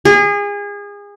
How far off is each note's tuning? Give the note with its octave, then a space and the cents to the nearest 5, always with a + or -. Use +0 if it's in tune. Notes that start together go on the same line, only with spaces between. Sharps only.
G#4 -30